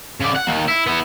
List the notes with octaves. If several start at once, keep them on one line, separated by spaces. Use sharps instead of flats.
C#3 D5
F#5
D#3 A#3
E4
B3 E4